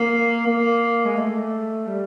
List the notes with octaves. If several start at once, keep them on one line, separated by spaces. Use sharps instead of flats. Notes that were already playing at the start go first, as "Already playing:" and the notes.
Already playing: A#3
A#3
G#3
A3
G3